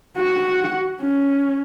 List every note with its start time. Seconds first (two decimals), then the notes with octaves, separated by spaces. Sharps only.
0.17 F#4 F#5
1.02 C#4